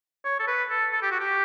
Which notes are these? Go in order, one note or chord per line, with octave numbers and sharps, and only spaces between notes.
C#5
A4
B4
A4
A4
G4
F#4
G4